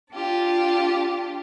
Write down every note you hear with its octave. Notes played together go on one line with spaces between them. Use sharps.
D4 F4 G4 A5